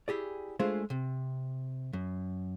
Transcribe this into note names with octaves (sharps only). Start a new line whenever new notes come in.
E4 G4 G#4 D5
G#3 A3 D4 F4 G#4 C5
C3
F#2